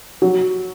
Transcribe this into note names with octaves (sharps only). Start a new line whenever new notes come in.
F#3